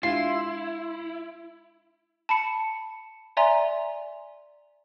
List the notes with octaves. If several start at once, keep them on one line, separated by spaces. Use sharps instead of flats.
G#3 D4 E4 F4 G4 C6
A5 B5 C#7
D5 E5 G#5 A#5 C6